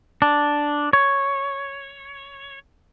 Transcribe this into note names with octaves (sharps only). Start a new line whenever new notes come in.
D4
C#5